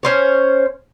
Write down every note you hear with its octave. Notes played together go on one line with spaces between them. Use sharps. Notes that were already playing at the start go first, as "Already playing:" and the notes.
C#4 C5 C#5